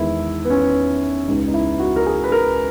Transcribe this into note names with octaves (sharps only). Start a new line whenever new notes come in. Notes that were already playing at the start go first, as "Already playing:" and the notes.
Already playing: E2 D#3 G#3 E4
B3
C#4
C#2 C#3 G#3 B3 D#4
D#4
E4
F#4
A#4
G#4
B4
A#4